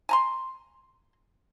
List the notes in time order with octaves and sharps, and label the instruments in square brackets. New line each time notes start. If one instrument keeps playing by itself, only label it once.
[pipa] G#5 A#5 C6